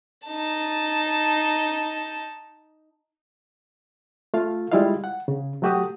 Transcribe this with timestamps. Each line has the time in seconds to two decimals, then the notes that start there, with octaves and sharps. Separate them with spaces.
0.26 D#4 A5
4.34 A3 F4 F5
4.72 G3 G#3 E4 F4 D#5 F5
5.04 F#5
5.28 C#3
5.62 F#3 A3 F#4 G4 F#5 D#6